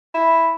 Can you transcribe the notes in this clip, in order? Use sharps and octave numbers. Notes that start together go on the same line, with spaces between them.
E4